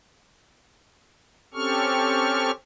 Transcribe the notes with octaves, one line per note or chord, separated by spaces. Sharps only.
C4 C#4 G4 A4 C#6 F6